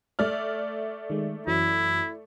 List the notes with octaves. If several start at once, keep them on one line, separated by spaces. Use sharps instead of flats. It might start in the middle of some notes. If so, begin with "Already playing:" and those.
A3 D5 E5 F6
D#3 G#3
F#2 E3 F#3 E4